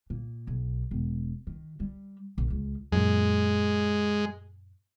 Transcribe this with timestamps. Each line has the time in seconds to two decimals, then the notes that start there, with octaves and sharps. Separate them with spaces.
0.10 A#2
0.47 B1
0.91 E1
1.47 D#3
1.80 G3
2.38 A#1
2.50 C#2
2.92 F#2 A#2 G#3